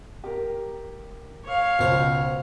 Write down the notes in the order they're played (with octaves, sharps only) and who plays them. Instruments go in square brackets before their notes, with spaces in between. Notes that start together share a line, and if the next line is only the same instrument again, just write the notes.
[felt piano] G4 A#4
[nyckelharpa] C#5 F5
[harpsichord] C#2 C5 [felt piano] B2